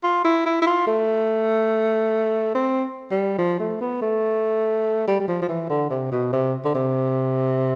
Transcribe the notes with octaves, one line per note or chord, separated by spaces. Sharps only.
F4
E4
E4
E4
F4
A3
C4
G3
F3
A3
B3
A3
G3
G3
F3
F3
E3
D3
C3
B2
C3
D3
C3